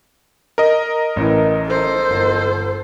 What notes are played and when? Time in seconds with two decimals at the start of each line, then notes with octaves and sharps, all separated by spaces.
0.58 A#4 D#5
1.16 A1 A2 E3
1.67 A4 C5
2.10 G1